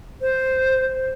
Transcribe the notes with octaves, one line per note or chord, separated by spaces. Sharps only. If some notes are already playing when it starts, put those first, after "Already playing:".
C5